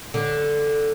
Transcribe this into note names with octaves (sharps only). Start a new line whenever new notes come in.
D3